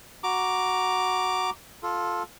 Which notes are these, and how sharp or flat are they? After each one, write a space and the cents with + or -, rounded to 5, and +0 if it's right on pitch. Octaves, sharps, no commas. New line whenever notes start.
F#4 +0 A#5 +0 D6 +0
F4 +10 A4 -5